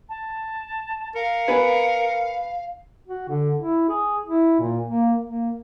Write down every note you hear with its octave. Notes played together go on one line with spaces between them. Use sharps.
A5
A#4 F5 C#7
B3 B4 G#5
F#4
D3
E4
G#4
E4
A#2
A#3
A#3